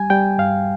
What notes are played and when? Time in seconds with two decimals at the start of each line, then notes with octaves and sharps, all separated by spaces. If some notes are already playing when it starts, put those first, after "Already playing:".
Already playing: G3 G#5
0.10 G3 G5
0.38 G2 F5